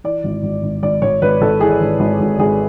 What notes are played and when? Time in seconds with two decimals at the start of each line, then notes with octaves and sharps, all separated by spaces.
0.04 E3 D5
0.24 G#1
0.43 G#1
0.63 G#1
0.83 G#1 D5
1.02 G#1 C#5
1.22 G#1 B4
1.41 G#1 A4
1.60 E3 G#4
1.81 G#1
1.99 G#1
2.20 G#1
2.39 G#1 G#4